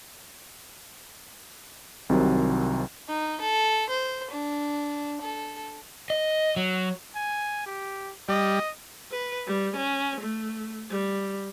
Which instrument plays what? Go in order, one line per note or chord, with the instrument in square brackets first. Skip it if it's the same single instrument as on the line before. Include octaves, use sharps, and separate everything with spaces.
[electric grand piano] C2 C3 D#3 F#3
[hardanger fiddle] D#4
A4
C5
D4
A4
[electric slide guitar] D#5
F#3
[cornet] G#5
G4
[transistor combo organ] G3 [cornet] D#5
[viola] B4
G3
C#4
A3
G3